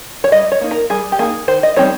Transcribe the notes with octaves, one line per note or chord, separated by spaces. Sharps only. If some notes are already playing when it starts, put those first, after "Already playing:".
C#5
G3 D#5
C#5
A#3 D#4
A#4
G3 G#4
G4
A#3 D#4 G#4
D#3 C5
D#5
G3 C4 D#4 C#5